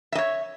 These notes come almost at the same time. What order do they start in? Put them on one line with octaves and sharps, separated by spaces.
E5 D#5 C#5